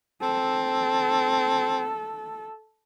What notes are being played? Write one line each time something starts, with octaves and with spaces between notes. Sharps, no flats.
C4 A4